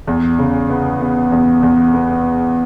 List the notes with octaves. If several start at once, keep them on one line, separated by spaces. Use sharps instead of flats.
E2
C#3
B3
B3
E2
E2
B3